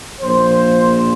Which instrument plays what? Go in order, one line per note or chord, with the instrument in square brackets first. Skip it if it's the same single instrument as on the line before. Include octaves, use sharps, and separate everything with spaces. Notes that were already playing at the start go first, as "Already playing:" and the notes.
[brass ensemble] A#1 A#2 C5